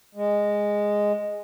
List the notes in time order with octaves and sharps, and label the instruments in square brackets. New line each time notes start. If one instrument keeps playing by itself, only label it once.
[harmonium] G#3